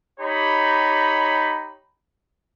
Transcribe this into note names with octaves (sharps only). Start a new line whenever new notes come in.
D#4 G4 C#5 B5